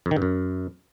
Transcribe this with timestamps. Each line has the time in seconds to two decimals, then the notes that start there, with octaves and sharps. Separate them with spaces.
0.06 F2
0.11 D#3
0.16 G2
0.22 F#2